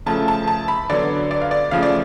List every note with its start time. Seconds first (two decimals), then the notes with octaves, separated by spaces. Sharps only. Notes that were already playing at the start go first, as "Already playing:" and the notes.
0.06 C#3 F3 A3 A5
0.28 A5
0.47 A5
0.68 B5
0.90 D3 F#3 B3 D5
1.31 D5
1.42 F5
1.51 D5
1.71 C#3 F3 A3 F5
1.83 D5